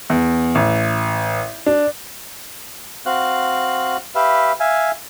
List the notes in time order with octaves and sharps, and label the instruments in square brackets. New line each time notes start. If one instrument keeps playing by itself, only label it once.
[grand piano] E2
A1
D4
[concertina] C4 F#4 F5 F#6
G4 B4 E5 F5
E5 F5 G#5